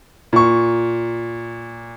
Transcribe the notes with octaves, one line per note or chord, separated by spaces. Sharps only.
A#2 C#6